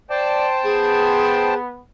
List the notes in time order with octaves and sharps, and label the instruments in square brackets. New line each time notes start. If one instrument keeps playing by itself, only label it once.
[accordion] C5 G5 A5 [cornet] D5
[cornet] B3 [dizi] G#4